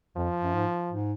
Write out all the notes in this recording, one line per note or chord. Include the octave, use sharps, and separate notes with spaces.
F2 F3
F#2
G#2
G#2